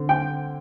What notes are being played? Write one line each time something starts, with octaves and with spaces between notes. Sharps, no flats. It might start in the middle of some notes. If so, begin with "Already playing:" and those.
Already playing: D3 C4
G5